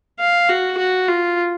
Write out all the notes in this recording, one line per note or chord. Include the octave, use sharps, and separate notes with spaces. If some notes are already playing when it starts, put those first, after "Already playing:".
F5
F#4
F#4
F4